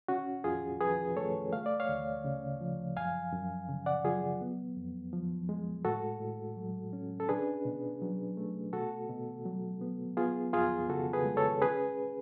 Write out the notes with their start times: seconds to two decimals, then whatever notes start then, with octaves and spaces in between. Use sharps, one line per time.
0.08 C#4 F#4
0.44 F2 F4 G#4
0.80 F3 G#4 B4
1.16 A3 A4 C#5
1.53 A3 F5
1.66 D5
1.80 C#5 F5
1.89 D2
2.24 C#3
2.61 F3
2.97 F#2 F5 G#5
3.32 F#2
3.69 C#3
3.86 D5 F#5
4.05 F#3 F4 G#4
4.41 B3
4.77 F2
5.13 F3
5.49 G#3
5.85 A2 F#4 A4
6.21 A2
6.57 F#3
6.93 C#4
7.20 A4
7.29 D4 G#4 B4
7.65 B2
8.01 F#3
8.37 A3
8.73 B2 F#4 A4
9.09 B2
9.46 F#3
9.81 B3
10.17 B3 F4 G#4
10.53 F2 F4 G#4
10.89 C#3 F#4 A4
11.13 G#4 B4
11.25 G#3
11.37 A4 C#5
11.61 C#4 G#4 B4